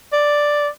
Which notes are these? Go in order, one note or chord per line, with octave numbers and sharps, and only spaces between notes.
D5